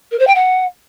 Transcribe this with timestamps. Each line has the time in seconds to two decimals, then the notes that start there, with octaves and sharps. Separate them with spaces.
0.11 A#4
0.19 C5
0.27 G5
0.35 F#5